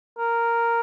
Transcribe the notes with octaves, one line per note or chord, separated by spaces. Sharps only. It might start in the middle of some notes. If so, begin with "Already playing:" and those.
A#4